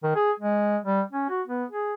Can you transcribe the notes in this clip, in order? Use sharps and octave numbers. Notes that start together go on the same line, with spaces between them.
D#3
G#4
G#3
G3
C#4
F#4
B3
G#4